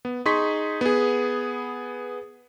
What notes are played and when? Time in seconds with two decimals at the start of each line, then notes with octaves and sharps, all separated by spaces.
0.05 B3
0.26 D#4 G#4 C6 C#6 B6
0.81 B3 G#4